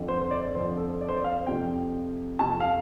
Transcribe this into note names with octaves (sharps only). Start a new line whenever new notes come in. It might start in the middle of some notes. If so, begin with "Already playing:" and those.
Already playing: F2 D3 F3
C5
C5
D5
F2 D3 F3 C5
A4
D5
C5
D5
F5
F2 C3 F3 G5
F2 C3 F3 A5
F5